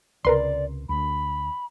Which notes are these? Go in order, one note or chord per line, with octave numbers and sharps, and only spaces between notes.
C#2 C3 A#4 B4 D5 C6
D2 B5